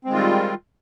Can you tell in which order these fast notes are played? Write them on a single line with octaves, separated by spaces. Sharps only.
C4 G#3 D#3 F4 G3